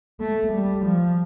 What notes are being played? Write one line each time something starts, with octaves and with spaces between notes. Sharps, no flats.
A3
G3
F3